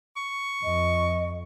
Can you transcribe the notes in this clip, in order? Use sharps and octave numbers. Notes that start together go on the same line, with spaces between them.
C#6
F2 D#5